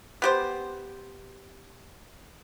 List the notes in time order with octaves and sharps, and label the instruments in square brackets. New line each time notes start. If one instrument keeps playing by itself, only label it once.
[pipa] B3 G4 C5